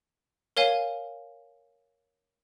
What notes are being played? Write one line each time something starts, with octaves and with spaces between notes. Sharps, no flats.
A#4 C#5 F5 G#5